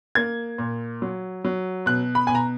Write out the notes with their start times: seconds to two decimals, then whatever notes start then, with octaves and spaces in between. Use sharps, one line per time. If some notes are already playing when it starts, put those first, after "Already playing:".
0.15 A#3 G#6
0.58 A#2
1.02 F#3
1.44 F#3
1.86 B2 F#6
2.15 B5
2.27 B2 G#5
2.35 A#5